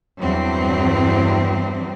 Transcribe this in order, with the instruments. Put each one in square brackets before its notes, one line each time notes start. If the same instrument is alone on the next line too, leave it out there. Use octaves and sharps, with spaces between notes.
[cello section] E2 G2 F#3 C4